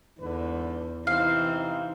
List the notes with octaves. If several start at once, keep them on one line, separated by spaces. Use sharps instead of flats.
E2 G#2 D3 B4
C3 E3 C4 D#4 F5